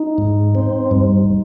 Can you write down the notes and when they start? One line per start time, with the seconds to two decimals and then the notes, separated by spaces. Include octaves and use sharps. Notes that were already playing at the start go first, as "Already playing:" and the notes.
Already playing: D#4
0.18 G#2
0.55 C4
0.91 G2